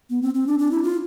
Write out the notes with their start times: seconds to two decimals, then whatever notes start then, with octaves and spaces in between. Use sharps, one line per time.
0.10 B3
0.22 C4
0.35 C4
0.47 D4
0.59 D4
0.71 E4
0.83 F4